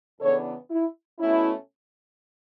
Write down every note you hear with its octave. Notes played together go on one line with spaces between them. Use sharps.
E2 C#3 E3 B3 D4 A4 C#5
E4
B2 A3 C#4 E4